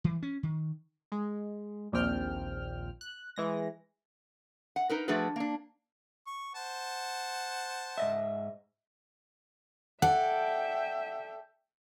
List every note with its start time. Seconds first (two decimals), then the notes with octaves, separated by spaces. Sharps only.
0.04 E3
0.23 C#4
0.43 D#3
1.12 G#3
1.92 A#1 D#2 A#2 C4 G5 F6
3.01 F#6
3.36 E3 G#3 A#6
4.76 F#5
4.89 D#4 A#4 B4
5.08 F3 A3 D4 F#4 G#4 B4
5.36 A#3 D4
6.27 C#6
6.55 C5 F#5 A5
7.98 G#2 D#5 E5
10.02 A4 D5 E5 F#5 G5